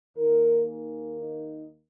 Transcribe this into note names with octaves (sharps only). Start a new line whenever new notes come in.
D#2 D#3 A#3 A#4
G#4
D#4